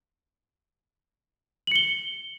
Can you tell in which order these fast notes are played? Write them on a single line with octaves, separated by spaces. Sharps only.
F#7 C#7 G7